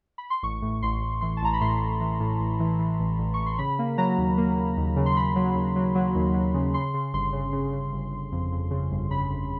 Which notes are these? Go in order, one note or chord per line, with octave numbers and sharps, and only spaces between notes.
B5
C6
A1 C#6
A2
A1 C6
A1
E3 C6
A5
A1 A#5
B5
A2 C6
A1
E3
A2
A1
E3
E3
A1
A1
A1 C#6
C6
C#3 B5
A#3
F#3 A#5
D#2
A#3
A#3
D#2
C#3
C6
C#3 B5
F#3
D#2
F#3
F#3
D#2
F#3
C#3
C#3 C6
C#3
G1 C6
C#3
C#3
C#3
G1
G1
F2
F2
C#3
G1
C#3 B5
G1